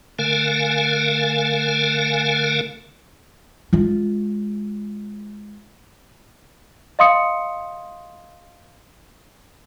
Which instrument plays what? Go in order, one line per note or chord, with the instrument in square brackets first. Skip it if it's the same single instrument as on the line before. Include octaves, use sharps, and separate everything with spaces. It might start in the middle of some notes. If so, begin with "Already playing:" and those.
[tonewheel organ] D3 A3 A#4 F5 G#5
[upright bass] G#3 F4
[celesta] D#5 F5 C6 D#6 C#7